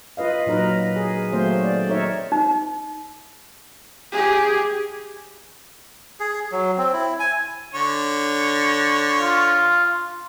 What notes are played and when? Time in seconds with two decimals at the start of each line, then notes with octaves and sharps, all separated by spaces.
0.17 F4 B4 D#5 F5
0.46 A#2 F#3 D#4 A#4 B4
0.96 G#4
1.32 D#3 F#3 A3 A#3 C4 C5
1.64 D5
1.89 D#4 A#4 C#5 E5
2.32 D#4
4.12 G4 G#4
6.20 G#4
6.52 F#3
6.77 C4
6.93 E4
7.19 G#5
7.74 D3 C#5
9.21 F4